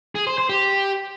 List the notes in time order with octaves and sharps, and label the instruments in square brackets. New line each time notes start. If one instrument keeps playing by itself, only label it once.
[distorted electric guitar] G#4
C5
C5
G4